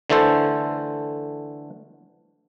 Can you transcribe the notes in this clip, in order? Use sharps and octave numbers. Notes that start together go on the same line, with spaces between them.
D3 E3 A3 A4 C5